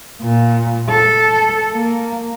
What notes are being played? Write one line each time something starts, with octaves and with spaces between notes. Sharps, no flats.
A#2
A4
A#3